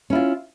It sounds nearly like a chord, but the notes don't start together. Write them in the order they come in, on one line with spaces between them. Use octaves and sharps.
C#4 E4 F4